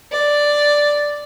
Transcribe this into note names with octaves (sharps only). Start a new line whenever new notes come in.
D5